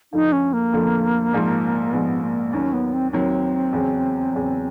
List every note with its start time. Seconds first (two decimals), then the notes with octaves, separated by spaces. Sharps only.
0.13 F2 D3 F3 A3 D#4
0.32 C#4
0.53 A#3
0.73 F2 D3 F3 A3
1.33 A#1 G#2 F3
1.93 A#1 G#2 F3 B3
2.22 A#3
2.53 D#2 D#3 F#3 C#4
2.73 B3
2.93 C4
3.12 D#2 D#3 F#3 C4
3.73 E2 C#3 F#3
4.33 E2 C#3 F#3